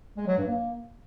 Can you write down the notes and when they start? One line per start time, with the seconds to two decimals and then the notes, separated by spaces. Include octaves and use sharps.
0.17 G#3
0.28 F#3
0.38 G2
0.48 A#3